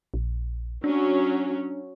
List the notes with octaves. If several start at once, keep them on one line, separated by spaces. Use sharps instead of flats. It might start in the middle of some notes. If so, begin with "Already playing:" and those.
A#1
F#3 C#4 D4